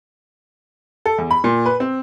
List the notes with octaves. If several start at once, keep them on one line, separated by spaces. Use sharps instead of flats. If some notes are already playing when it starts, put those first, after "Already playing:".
A4
E2
B5
A#2
B4
C4